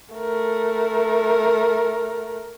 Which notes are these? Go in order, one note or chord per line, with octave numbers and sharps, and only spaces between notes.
A3 A#4